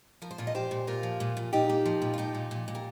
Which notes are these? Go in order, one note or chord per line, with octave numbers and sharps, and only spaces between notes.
F3 A#4
C5
A#2 F4 A#4
D#5
A#2 G4 C5
A#2
A#2 F4 A#4
F3
A#2
A#2
A#2 D#4 G4
A#3
F3
A#2
F4
F3 D#4 G4
A#2
A#2
A#2
A#4